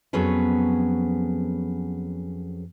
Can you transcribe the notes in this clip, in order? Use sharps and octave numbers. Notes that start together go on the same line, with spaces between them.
F2 F#3 B3 C#4 G#4 B4